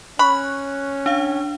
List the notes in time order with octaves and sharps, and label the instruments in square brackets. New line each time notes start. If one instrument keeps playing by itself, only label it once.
[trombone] C#4 [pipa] B5 [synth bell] C#6 F#6
[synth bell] D4 F5